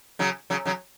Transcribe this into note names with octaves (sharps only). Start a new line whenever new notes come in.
C#3 F#3
C#3 F#3
C#3 F#3